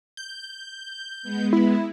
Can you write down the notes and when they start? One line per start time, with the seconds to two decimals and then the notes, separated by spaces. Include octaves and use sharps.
0.17 G6
1.23 G#3 B3
1.53 E4